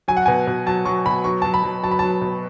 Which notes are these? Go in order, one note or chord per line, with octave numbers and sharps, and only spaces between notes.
F#3 G#5
F#5
B2 G#5
B2
F#3 A5
F#3 C#6
B2 B5
F#3 C#6
F#3 A5
B5
F#3
F#3 A5
B5
F#3 A5
B2